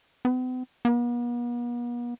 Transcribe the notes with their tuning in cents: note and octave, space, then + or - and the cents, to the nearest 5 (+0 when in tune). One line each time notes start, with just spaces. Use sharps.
B3 +45
B3 -45